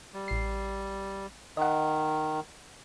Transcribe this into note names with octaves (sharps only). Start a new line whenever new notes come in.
G3
A1 C7
D#3 D#5 F#5